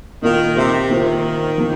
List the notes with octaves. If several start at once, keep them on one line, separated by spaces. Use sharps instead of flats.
A#2 D#3 A#3 F4 A#4
C3
D#3 A#3 F4 C5
F3 A#3